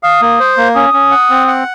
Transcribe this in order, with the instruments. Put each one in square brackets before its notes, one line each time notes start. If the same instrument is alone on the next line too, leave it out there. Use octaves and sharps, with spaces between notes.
[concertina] F5 [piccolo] D#6
[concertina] A#3
C5
A#3
[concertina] C#4 [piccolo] D#6
[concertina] C#4
F#5
C4
F#5